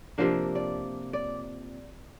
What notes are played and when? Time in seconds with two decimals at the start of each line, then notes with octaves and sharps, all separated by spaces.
0.18 C3 F3 A#3 D4
0.55 D5
1.13 D5